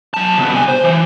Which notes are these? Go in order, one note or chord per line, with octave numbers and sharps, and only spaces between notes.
F#3 A5
C#3 B3
C2 G#5
C5
E3